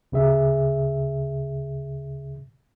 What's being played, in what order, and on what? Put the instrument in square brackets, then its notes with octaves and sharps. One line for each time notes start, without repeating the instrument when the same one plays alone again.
[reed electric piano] D2 C#3 G#4 E5